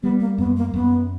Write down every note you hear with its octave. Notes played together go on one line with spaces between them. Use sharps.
G3 B3
A#3
F#2 B3
A#3
F#2 B3